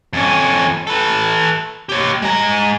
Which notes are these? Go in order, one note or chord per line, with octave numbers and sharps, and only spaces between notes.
F2 C#4
A4 B4
G4 C#5
G#3 A#5